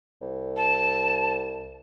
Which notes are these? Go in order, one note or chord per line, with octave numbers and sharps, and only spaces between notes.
C2
A5